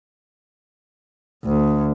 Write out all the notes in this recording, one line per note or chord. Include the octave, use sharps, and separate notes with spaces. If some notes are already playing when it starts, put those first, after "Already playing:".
D2